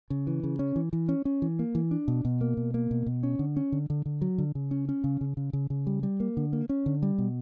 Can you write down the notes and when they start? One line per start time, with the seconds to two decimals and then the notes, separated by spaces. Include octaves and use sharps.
0.10 C#3
0.27 E3
0.43 C#3
0.59 C#4
0.76 E3
0.93 E3
1.09 C#4
1.25 C#4
1.42 E3
1.59 A#3
1.75 E3
1.91 D4
2.08 B2
2.25 B2
2.41 A#3
2.57 B2
2.74 A#3
2.91 B2
3.06 B2
3.23 C#4
3.39 D3
3.56 C#4
3.72 D3
3.90 D3
4.06 D3
4.22 F#3
4.38 D3
4.55 C#3
4.71 C#4
4.89 C#4
5.04 C#3
5.21 C#3
5.37 C#3
5.53 C#3
5.70 C#3
5.87 G3
6.03 G3
6.20 A#3
6.37 D3
6.53 A#3
6.69 C#4
6.86 D3
7.03 G3
7.18 B2